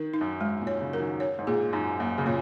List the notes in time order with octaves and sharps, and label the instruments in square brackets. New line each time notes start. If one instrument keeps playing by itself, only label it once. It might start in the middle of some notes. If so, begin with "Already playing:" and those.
Already playing: [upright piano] D#3 [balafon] A#4
[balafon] D#4
[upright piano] F#2
[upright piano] G#2 [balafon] G#3
[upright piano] A#2
[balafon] C#5
[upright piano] C#3
[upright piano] F#3 [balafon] A#4
[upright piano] D#3
[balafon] C#5
[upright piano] G#2
[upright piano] A#2 [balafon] G#4
[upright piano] F#2 [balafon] D#4
[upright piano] F#2 [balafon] A#3
[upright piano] C#3
[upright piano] A#2 [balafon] C#5